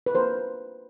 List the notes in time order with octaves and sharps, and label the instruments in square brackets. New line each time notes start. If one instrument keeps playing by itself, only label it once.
[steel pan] B4
A#3 D4 F4 A#4 C5